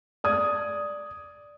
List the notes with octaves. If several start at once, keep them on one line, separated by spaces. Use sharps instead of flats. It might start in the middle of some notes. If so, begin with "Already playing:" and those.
D5 D#6 G#6